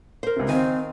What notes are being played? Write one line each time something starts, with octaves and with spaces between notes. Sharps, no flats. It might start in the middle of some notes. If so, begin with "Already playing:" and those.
A#4 C5
C#2 C3
D#3 C4 F5 G#5